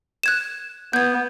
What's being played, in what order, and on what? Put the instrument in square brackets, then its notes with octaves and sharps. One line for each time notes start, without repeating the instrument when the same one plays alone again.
[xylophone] F#6 G#6 E7
[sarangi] B3 [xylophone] G6 G#6